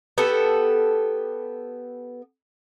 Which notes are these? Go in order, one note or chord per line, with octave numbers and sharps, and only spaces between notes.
B3 G4 A4